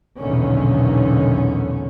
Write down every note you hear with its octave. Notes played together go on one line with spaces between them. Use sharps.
B1 E2 A#2 D3 D#3 C#4